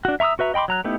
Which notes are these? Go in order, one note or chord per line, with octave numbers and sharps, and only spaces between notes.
D4 F#4
E5 A#5 C#6 D#6 E6
F#4 B4 E5 A#5
D#5 G5 B5 C6 D6
F#3 A#5 F#6
A3 B3 D#4 E4 G4